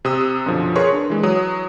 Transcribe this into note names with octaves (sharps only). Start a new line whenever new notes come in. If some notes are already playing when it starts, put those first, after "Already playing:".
C3 D#6 E6
F#2 B2 D3 F3
G#4 A#4 B4 C#5 C6 C#6
D4
E3 G#3
F#3 D#6